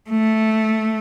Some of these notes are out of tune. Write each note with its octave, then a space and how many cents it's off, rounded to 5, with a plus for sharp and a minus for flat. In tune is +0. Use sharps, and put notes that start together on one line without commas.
A3 -5